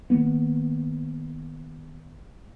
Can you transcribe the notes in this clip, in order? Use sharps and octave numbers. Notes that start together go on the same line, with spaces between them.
D#3 A#3 B3